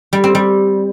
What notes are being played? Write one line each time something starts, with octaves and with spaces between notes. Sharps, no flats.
G3
C4
G3